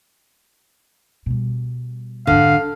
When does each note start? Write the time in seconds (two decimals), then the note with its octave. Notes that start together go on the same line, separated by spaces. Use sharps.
1.26 B2 G3
2.27 F2 G#2 D3 F5